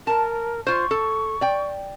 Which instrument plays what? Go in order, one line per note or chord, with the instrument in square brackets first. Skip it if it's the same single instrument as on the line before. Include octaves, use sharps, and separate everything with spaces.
[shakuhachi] A#4 [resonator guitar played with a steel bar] A5
[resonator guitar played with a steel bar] F4 C5 [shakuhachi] C#6
[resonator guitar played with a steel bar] A4
D5 G5